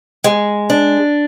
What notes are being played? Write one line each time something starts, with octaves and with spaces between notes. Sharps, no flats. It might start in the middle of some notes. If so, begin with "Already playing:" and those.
G#3
D4